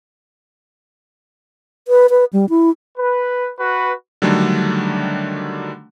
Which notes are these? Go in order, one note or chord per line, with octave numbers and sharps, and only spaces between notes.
B4
B4
G3
E4
B4
F#4 B4
D3 D#3 F#3 G3 A3 D4